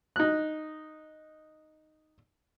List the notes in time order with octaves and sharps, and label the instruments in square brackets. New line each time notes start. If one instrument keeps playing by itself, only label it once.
[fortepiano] D#4 F#6